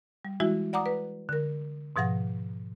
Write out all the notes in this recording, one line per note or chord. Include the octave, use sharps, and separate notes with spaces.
G3
E3 G#3 E4 F#4 E5
D5 F#5 A#5 D6 D#6
B4
D3 A#4
G#2 B2 F3 F#5 A#6